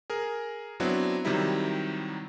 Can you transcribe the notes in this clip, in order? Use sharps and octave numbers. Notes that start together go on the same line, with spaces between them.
G#4 A#4
F#3 B3 C4 D4 E4
C3 D#3 F#3 G3 D#4 E4